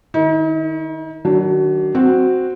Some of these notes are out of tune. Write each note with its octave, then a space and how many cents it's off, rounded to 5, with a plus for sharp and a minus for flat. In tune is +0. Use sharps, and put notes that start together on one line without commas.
D#3 -20 D#4 +45
D#3 -10 F#3 +25 D4 +0
C4 +0 F#4 +0